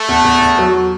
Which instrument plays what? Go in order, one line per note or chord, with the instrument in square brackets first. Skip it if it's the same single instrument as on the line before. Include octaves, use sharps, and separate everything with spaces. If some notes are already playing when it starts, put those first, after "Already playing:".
Already playing: [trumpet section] A3
[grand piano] E2
E2
E2
F#3